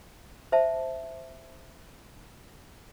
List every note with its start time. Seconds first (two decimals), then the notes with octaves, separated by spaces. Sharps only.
0.52 C5 E5 A5